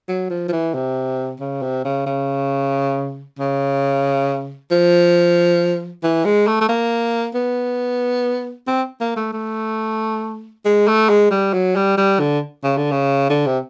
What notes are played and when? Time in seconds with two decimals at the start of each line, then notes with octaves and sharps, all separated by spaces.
0.09 F#3
0.30 F3
0.48 F3
0.52 E3
0.74 C3
1.40 C#3
1.62 C3
1.85 C#3
2.06 C#3
3.39 C#3
4.71 F3
6.03 E3
6.25 G#3
6.47 A3
6.61 A3
6.69 A#3
7.35 B3
8.67 C4
9.00 A#3
9.16 A3
9.33 A3
10.65 G#3
10.87 A3
11.09 G#3
11.31 G3
11.53 F#3
11.76 G3
11.97 G3
12.20 D3
12.64 C#3
12.77 D3
12.91 C#3
13.30 D3
13.46 C3